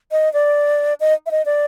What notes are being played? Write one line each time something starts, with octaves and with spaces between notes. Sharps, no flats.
D#5
D5
D#5
E5
D#5
D5